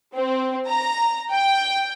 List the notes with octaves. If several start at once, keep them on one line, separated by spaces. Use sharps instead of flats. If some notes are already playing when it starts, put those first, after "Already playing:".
C4
A#5
G5